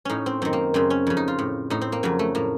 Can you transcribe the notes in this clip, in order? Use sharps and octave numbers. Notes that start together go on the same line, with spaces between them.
A2 C#4 D#4
C4
F#2 D#3 C4
A#3
F#2 C#3 C4
C#4
F2 C#3
D#4
F4
A2
A2 D#4
C4
A#3
F2 C#3 F#3
A3
A2 A#3